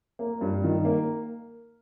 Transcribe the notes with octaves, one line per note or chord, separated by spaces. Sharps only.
A#3
G2
D#3
A#3